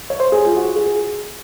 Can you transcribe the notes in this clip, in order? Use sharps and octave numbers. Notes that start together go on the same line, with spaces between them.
C#5
C5
G#4
F4
F#4
G#4